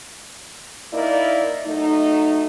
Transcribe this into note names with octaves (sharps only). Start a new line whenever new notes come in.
A#3 D#4 E4 A#4 D5
F#3 A3 D#4